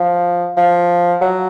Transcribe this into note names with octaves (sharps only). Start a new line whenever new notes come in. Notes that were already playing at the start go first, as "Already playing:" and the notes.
Already playing: F3
F3
F#3